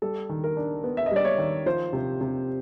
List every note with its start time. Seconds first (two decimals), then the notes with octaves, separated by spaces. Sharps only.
0.02 G3 A4
0.29 D#3
0.44 A#4
0.57 D4
0.84 B3
0.97 E5
1.06 D#5
1.11 G3 D5
1.25 C#5
1.38 D#3
1.66 F3 C5
1.93 C3
2.21 C3